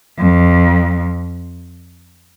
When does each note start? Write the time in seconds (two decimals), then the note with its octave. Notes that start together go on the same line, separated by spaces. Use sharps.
0.19 F2